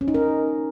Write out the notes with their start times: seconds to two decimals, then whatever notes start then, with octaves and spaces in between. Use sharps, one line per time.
0.01 C#4
0.08 D#4
0.14 A#4